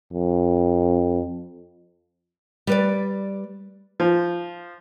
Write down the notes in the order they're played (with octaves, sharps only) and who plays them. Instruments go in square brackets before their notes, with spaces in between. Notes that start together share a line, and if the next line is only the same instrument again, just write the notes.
[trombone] F2
[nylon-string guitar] G3 B4 D5
[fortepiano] F3